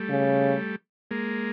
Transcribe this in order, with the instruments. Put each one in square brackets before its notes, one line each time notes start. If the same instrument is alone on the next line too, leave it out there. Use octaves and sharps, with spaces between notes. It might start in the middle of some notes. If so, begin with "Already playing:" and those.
Already playing: [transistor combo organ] G3 A3
[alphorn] C#3
[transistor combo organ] G#3 A#3